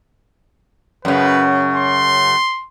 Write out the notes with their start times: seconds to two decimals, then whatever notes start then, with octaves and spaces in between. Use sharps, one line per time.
1.05 F#2 C#3 B4
1.75 C6